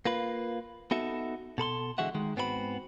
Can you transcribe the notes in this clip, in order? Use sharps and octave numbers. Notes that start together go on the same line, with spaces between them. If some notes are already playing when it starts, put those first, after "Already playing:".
A#3 F4 B4
B3 D#4 F#4 A4 E5
B2 A4 B5 C6
D3 E3 G#3 F#4 E5 F#5
D#3 G#3
G#2 B3 C4 F#4 A#4 B5